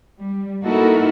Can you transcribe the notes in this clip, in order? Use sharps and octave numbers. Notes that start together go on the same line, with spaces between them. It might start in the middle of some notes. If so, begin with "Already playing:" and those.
G3
A#3 D#4 E4 F#4 A4 A#4